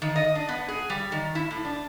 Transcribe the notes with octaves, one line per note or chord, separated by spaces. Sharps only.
D#3
D#5
D4
B3
G#4
G3
D#3
E4
A2
D4